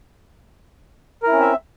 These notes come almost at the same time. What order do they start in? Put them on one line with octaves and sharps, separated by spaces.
A#4 E4 C#4 C4 E5